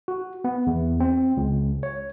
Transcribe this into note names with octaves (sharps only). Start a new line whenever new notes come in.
F#4
B3
E2
C4
C#2
C#5